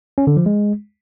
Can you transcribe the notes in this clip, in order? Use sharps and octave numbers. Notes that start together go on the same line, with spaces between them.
C#4
D3
F3
G#3